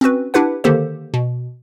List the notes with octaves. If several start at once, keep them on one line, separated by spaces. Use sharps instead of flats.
C4 C#4 F#4 B4
D4 E4 G4 B4 F#5
D3 D#3 A#3 G4 A4 C5
B2